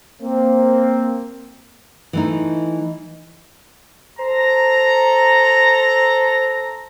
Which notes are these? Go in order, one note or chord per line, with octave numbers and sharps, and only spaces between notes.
A#3 C4
E3 A3 D#4
A4 C5 A#5